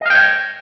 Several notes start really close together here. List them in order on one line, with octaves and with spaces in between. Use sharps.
D#5 F5 G5 C#5